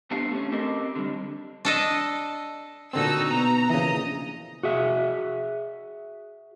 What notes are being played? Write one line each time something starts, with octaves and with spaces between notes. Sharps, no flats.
G2 A3 B3 D4 G4 F5
A3 C#4
C4 G4 A4 A#4 D#5
D3 G3
D4 A4 D#5
A#2 D3 C4 D#4 F#4 A4 E6
B2 A#5
A#1 C#3 E3 D#5
F#4 G#4 E5